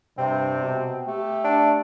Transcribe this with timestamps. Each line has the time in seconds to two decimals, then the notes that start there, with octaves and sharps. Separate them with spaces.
0.18 G2 C3 C4
0.60 B2
1.07 A3 G4
1.44 D4